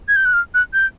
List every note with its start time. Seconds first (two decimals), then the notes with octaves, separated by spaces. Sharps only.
0.09 G#6
0.16 G6
0.25 F#6
0.33 F6
0.55 F#6
0.74 G6